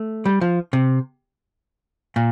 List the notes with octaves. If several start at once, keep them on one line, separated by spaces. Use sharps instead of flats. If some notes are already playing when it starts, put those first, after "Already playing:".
Already playing: A3
G3
F3
C3
A#2